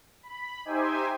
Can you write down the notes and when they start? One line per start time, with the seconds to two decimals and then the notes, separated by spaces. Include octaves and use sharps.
0.23 B5
0.65 D#4 G4 C5 E5 G5 G#5